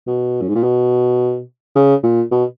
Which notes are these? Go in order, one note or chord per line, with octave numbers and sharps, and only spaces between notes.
B2
F#2
G#2
A#2
B2
C#3
A#2
B2